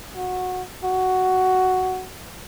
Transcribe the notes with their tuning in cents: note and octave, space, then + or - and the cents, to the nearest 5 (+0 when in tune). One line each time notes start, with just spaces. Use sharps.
F#4 -15
F#4 +5